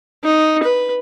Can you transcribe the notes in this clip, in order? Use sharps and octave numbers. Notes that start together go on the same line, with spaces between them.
D#4
B4